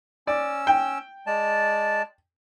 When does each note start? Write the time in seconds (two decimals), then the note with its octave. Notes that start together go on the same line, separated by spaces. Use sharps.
0.27 C#4 D5 E6
0.67 G5
1.27 G#3 D5 A5